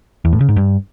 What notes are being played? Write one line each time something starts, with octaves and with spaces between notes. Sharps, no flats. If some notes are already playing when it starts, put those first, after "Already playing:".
E2
A2
C#3
G#2
G2